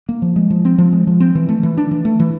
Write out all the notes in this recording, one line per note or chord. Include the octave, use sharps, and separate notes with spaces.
A#3
F3
G#3
F3
C4
F3
G#3
F3
C4
E3
A3
E3
D4
E3
A3
E3